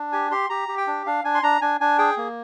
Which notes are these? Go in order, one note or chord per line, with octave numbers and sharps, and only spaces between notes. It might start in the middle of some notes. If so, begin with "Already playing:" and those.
Already playing: D4
G4 G#5
G4 C6
G4 A#5
G4
G5
D4
D4 F5
D4 G#5
C6
D4 A#5
D4 G#5
D4 G#5
G#4 G5
A#3